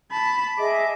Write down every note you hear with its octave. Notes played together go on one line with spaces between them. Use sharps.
A5 B5
G#4 D#5 E5 D6